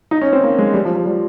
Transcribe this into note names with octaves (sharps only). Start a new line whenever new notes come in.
D#4
C#4
C4
A#3
G#3
G3
F3
F3
G3